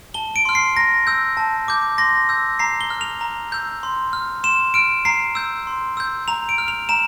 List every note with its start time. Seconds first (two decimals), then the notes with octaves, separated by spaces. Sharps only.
0.14 A5 G7
0.36 D7
0.45 C6 F6
0.55 C7
0.76 A#5 A#6
1.07 E6 G6
1.37 A5
1.68 D6 G6
1.98 C6 A#6
2.29 E6 G6
2.59 A#5 C7
2.81 G7
2.90 F6
3.01 F7
3.21 A#5
3.52 E6 G6
3.83 C6
4.13 F6
4.44 C6 E7
4.74 F6 D7
5.05 A#5 C7
5.35 E6 G6
5.67 C6
5.97 E6 G6
6.28 A#5 F7
6.49 D7
6.58 F6
6.68 F7
6.89 A#5 E7